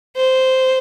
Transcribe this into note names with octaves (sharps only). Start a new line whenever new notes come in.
C5